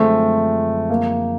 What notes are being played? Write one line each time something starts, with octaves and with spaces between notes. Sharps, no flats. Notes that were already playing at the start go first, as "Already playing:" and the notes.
Already playing: F#2 D3 F3 G#3 A3 C4
A#3